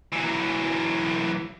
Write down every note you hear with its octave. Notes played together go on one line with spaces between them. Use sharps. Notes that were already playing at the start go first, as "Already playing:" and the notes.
E3 F#3